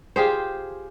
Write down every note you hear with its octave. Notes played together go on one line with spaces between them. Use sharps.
F4 G4 G#4 C5